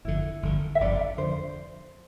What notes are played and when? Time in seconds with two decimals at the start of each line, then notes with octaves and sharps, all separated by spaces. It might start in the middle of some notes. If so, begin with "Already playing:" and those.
0.05 G1 F2 D3 E4
0.43 G1 F2 D3
0.75 E5
0.80 G1 F2 D3 D5
1.18 F2 D3 C5